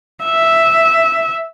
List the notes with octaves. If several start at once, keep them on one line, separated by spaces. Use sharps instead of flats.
E5